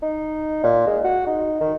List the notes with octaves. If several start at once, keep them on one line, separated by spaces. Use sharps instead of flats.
D#4
A#2
G#3
F#4
D#4
D#3